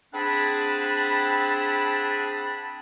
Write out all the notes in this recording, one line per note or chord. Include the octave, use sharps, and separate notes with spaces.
C4 D4 G#4 F#5 A5 B5